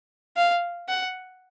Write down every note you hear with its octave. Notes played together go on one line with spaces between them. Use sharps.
F5
F#5